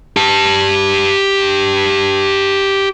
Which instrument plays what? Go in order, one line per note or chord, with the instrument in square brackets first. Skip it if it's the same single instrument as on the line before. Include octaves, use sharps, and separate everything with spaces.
[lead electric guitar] G4 A5